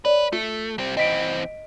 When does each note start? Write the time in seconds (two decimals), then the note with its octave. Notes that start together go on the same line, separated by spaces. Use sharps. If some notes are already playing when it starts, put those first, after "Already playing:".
0.05 B4 C#5 D5
0.33 A3 F4
0.78 G3 C4
0.97 E3 C4 D#5 B6 D7